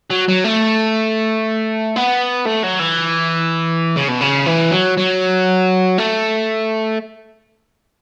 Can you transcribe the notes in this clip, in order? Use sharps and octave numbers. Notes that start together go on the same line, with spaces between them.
F#3
F#3
A3
B3
A3
F#3
E3
C#3
B2
C#3
E3
F#3
F#3
A3